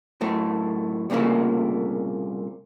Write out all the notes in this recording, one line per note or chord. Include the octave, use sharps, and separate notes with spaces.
F#2 A2 A3
C2 A#2 C#3 A3 A#3